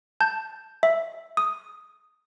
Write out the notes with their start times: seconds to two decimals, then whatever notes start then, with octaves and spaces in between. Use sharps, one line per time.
0.21 A5 G6
0.83 E5
1.37 D#6